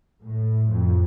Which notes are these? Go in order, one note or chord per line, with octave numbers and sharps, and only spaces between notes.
A2
F2